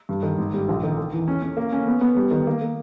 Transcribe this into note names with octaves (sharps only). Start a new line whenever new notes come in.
G2
D#3
G#1
G3
A#1
D#3
D#3
E2
C#4
C#4
A#3
C#4
B3
B3
G3
D#3
A#3
A#3